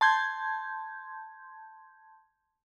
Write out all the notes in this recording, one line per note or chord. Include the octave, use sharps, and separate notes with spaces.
A5 C6 G6 G#6